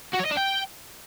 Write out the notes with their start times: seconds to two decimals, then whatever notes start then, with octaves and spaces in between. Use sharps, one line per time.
0.14 F#4
0.20 C#5
0.26 D#5
0.31 D4
0.37 G5